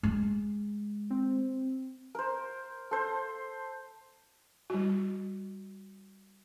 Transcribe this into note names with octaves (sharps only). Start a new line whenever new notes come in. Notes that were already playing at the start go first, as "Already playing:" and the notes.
G#3
C4
A#4 C5
A4 C5
G3 F#4